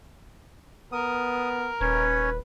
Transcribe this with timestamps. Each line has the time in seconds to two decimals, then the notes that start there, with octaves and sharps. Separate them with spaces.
0.92 B3 A#4 D#6
1.81 D#1 C#4 B4 C#5